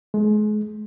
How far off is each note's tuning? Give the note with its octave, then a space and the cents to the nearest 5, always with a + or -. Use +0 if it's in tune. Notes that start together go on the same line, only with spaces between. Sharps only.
G#3 +30